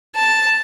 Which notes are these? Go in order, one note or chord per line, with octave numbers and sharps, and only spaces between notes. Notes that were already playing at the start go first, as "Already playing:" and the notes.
A5